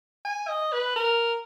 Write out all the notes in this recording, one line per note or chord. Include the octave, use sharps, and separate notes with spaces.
G#5
D#5
B4
A#4